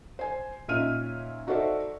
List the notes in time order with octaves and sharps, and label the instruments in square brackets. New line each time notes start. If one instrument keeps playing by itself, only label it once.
[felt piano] C5 G#5
A#2 C#4 D#4 E5 F6 D#7
D#4 F#4 A4 C5 D5 E5